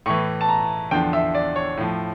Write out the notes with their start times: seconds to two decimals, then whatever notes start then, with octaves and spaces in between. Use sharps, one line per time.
0.06 A2 E3 C#6
0.41 A5
0.49 A#5
0.91 E2 D3 F3 G5
1.13 E5
1.35 D5
1.56 C#5
1.77 A2 F3